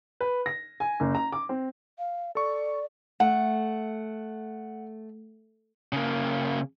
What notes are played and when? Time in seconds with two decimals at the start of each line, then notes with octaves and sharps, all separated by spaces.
0.21 B4
0.46 A#6
0.80 G#5
1.00 F#1
1.15 A#5
1.32 D6
1.49 C4
1.99 F5
2.35 A4 D5 C#6
3.20 A3 F#5
5.93 C#3 A#3